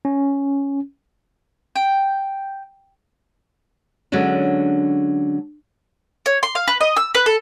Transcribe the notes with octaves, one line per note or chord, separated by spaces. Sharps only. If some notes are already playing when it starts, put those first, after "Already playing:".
C#4
G5
D3 F#3 G#3 C#4 D4
C#5
C6
F5
B4
D#5
E6
B4
A4